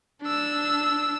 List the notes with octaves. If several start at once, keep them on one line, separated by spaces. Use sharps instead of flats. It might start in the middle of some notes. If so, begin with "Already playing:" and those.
D4 E6